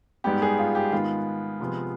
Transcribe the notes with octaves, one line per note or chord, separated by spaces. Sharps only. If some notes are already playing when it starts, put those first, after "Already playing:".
G#2 G3 B3 G4
G#4
F4
G4
G#2 D#3 G#3 B3 F4
C3 F3 G#3 B3